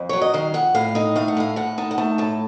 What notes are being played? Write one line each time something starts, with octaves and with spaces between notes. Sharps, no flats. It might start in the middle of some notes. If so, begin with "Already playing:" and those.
Already playing: F2
F#3 C#5
D#5
D#3 F5
F2 F#5
A2 F5
D#4 D#5
A3 F5
F#5
A2 F5
A2 F#5
D#4 A5
F#5
A3 A5
A2 A5